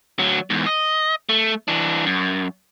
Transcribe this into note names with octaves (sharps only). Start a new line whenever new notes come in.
D2 F#3
E2 G#2
D#5
A3
E3 D4
F#2